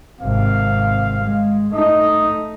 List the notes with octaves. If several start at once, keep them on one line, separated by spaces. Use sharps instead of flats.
G#1 C3 F5
G#3
A3 D#4 D#5